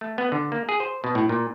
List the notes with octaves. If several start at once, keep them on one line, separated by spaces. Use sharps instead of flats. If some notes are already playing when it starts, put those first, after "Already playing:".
A3
B3
D3
A#3
G#4
C5
B2
A2
A#2